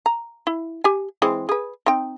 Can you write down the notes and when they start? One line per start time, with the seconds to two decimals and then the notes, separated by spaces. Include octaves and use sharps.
0.06 A#5
0.47 E4
0.84 G4 G#5
1.22 E3 G#3 C4
1.49 G#4 B4
1.86 C4 D#4 G5